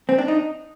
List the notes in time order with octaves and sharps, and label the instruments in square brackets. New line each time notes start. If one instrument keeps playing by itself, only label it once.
[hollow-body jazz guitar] C4
D4
D#4